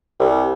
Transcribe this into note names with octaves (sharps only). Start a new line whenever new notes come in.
C2